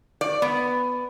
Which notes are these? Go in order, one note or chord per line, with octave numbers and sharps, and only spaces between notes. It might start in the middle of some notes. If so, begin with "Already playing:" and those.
D5
B3